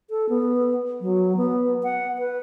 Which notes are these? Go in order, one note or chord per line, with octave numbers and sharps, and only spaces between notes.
A4
B3
F#3
B3
F#5
B4